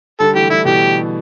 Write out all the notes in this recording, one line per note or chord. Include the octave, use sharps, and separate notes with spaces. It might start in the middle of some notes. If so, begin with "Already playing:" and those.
D3 G3 A4
E3 A3 G4
D3 G3 E4
B2 E3 G4